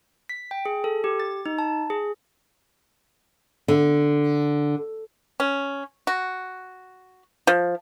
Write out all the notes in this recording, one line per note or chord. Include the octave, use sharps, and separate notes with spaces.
B6
G5
G#4
A4
G4
A6
D#4
A5
G#4
D3
C#4
F#4
F3